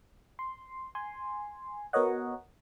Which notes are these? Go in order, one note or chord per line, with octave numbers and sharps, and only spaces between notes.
C6
G#5 C6
B3 F#4 A#4 C#5 D#5 F#5